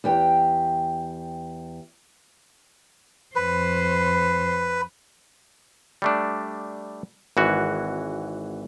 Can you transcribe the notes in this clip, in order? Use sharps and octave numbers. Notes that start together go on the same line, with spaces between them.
E2 G4 G5
F2 B4 C5
G3 A3 D4
G#1 E3 F#4